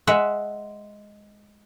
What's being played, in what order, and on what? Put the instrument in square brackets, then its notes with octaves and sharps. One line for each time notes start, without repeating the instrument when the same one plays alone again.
[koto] G#3 E5 F#5